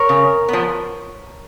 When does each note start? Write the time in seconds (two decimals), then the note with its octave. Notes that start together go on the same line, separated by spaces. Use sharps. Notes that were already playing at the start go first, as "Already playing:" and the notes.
Already playing: A#4 C#5
0.09 C#3
0.48 F3 B3